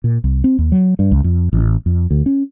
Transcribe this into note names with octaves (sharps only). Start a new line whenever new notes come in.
A#2
C2
C4
D#2
F#3
G2
C#2
F2
A1
F2
D2
C#4